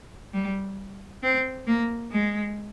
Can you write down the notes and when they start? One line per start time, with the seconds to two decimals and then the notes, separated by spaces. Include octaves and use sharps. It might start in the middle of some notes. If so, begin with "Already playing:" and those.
0.33 G3
1.23 C4
1.67 A#3
2.12 G#3